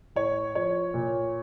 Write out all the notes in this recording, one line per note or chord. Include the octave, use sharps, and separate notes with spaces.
A2 C#5
F3 C#5
A#2